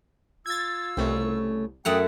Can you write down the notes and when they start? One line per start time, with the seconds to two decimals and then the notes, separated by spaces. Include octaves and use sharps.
0.46 F4 E6 G#6 A6
0.97 C2 C#3 A3 C#5
1.85 F#2 A3 F#5 G5 D#6